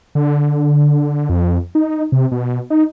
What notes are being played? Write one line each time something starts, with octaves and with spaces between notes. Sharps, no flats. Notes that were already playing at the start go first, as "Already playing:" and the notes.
D3
F2
D#4
C3
B2
D#4